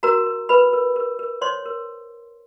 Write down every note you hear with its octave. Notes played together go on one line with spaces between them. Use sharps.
F#4 A#4 A#5
A#4
A#4 B4 B5
A#4
A#4
A#4
C5 C#5 C6
A#4